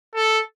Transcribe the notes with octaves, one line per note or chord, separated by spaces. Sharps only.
A4